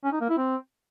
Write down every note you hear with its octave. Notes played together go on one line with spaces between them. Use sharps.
C#4
D#4
A#3
E4
C4